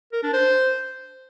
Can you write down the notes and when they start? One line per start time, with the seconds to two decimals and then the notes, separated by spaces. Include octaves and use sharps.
0.13 A#4
0.23 D4
0.33 C5